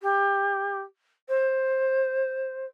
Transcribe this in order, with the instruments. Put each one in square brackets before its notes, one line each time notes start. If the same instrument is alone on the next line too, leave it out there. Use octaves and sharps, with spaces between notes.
[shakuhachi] G4
C5